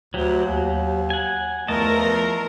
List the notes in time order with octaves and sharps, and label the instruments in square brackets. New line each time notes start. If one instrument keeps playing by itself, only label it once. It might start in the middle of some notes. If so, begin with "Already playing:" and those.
[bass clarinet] D2 [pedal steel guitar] F#3 G4
[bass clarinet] D#2
[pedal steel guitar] F#5 G#5
[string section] E2 F3 A#4 [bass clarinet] A3 [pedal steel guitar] D#5 A5